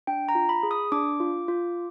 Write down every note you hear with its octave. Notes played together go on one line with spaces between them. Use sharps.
D4 G5
A#5
F4
B5
G#4
D#6
D4 D6
F4
F4